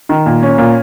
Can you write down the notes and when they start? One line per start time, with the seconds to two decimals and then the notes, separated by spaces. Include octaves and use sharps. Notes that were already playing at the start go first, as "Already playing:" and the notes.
0.09 D#3
0.26 A#2
0.43 C#4
0.58 A#2